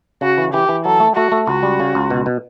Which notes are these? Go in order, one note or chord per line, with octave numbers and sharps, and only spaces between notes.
C#3 F#4
E3
E3 G4
E3
F#3 A4
A3
A3 F#4
A3
C#2 F#4
G3
C#3
C#2
B2
B2